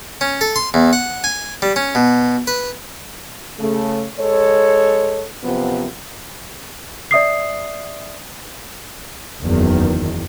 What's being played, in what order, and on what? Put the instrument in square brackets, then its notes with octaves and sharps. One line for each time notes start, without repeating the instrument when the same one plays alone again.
[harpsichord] C#4
A4
C6
E2
F#5
G#5
G3
C#4
B2
B4
[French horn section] C#3 A3
G#3 A4 C#5
F#2 C3 F3 B3
[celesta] D5 E5 D#6 C7
[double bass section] F#1 E2 D#3